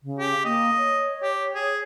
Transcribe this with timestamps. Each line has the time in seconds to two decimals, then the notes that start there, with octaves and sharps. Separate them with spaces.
0.03 C#3
0.19 G4
0.45 A#3 D#5
0.78 C#5
1.22 G4
1.54 G#4